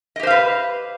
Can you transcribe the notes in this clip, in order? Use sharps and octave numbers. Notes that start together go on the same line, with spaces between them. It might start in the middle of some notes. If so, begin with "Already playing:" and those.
G4 B4 C5 D#5 F5